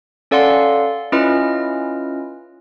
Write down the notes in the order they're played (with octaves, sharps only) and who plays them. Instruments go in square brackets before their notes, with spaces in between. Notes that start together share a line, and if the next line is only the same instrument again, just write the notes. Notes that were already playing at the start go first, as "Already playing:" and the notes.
[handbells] C#4 A4 D5 F5 F#5 C6
C#4 E4 F4 B4 D#5 F6